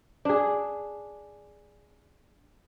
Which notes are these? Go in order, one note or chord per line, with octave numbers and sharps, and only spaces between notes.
D4 G#4